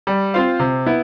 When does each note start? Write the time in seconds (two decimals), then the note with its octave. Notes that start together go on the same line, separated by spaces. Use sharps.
0.07 G3
0.34 C4 F4 C5 F5
0.59 C3
0.86 B3 E4